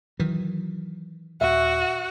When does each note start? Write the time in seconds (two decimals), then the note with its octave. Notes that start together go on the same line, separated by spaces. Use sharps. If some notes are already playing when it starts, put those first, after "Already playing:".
0.19 D#3 E3 F#3
1.41 D#1 F#4 E5